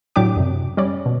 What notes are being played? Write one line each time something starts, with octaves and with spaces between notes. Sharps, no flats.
A2 F#3 D4 G4 D6
F#2 C3
G3 C#4 D5
B2